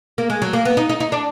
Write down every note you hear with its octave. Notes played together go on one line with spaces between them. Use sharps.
A#3
G#3
F#3
A#3
B3
D#4
D#4
D#4
D4